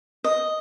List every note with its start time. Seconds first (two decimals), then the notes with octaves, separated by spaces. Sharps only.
0.24 D#5